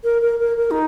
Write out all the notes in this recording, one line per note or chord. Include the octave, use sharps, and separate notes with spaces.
A#4
A#4
A#4
A#4
D#4